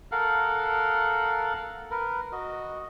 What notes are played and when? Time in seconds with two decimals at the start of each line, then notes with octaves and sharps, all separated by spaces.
0.12 A4 A#4 F5 F#5
1.91 A#4 B4
2.32 F#4 D#5